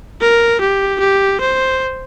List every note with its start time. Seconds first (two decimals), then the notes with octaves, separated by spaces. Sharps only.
0.21 A#4
0.61 G4
1.00 G4
1.41 C5